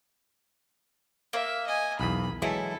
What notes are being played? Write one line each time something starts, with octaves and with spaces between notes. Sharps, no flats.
A#3 E5
D#5 G#5
B1 E2 B5
E3 F#3 G#3 E4 A4